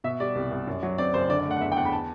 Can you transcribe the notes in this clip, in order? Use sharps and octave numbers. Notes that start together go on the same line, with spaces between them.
B2 E5
G3 D5
C2
C2
F#2
F#3
C4 D5
F#1 C5
D3 D5
D5
A3 F#5
F#5
E2 E5
G5
E2 F#5
B5
A5